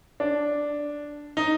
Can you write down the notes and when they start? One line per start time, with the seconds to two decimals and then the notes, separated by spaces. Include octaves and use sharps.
0.20 D4
1.37 D#4